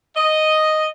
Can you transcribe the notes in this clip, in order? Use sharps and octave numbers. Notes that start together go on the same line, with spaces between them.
D#5